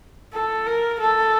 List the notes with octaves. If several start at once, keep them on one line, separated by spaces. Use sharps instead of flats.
A4
A#4
A4